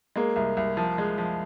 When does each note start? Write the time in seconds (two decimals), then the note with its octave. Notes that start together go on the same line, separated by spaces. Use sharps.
0.16 G#3 A#3
0.36 C2
0.57 C2
0.77 F3
0.98 G#3
1.18 F3